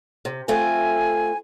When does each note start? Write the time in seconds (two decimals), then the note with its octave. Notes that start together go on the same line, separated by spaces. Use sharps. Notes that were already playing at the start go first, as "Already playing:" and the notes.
0.25 C3
0.48 A3 C4 F4 G#5